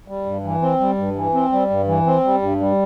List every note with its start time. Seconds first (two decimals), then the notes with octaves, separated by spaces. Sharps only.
0.08 G3
0.26 G2
0.44 E3
0.62 C4
0.80 G3
0.98 G2
1.16 E3
1.34 C4
1.52 G3
1.70 G2
1.88 E3
2.06 C4
2.24 G3
2.42 G2
2.60 G3